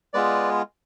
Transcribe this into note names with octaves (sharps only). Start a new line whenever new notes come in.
G#3 B3 F4 G#4 B4 D5